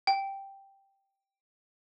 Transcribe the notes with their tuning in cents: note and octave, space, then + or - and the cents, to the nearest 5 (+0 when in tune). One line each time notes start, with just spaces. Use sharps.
G5 +0